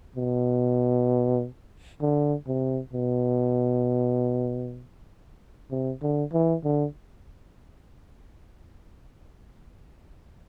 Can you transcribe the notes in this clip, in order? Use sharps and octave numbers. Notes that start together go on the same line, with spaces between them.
B2
D3
C3
B2
C3
D3
E3
D3